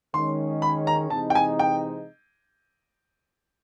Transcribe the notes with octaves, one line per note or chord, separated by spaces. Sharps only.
D#3 G#3 C#4 C6
B5
A#5
C3 E3 G#3 C4 D#4 A5
G5
G#5
G5